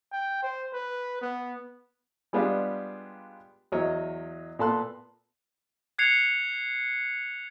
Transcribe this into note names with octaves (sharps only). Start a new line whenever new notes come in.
G5
C5
B4
B3
G3 G#3 B3 D4 F4 G4
E2 F#3 C#5 D#5
A#2 B3 A4 A5 C6 F#6
F#6 G#6 C7 C#7 F7